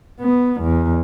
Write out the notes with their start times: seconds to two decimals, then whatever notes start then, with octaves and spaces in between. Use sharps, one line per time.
0.20 B3
0.62 E2